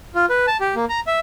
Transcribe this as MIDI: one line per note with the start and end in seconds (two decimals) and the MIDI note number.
0.15 0.26 65
0.29 0.46 71
0.47 0.57 81
0.60 0.75 67
0.75 0.85 58
0.89 1.00 82
1.07 1.20 76